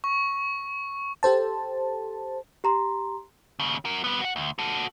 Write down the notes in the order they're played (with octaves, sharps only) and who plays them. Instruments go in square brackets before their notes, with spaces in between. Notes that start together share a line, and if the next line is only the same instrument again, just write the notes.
[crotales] C#6
[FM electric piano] G4 A4 C5 A5
[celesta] G4 A#5 C6
[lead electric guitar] D#2 C#3
F#4 A#4
G3 B3
F#4 F#5
D2
F#4 A4